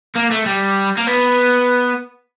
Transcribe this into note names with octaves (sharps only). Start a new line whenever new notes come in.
A#3
A3
G3
A#3
B3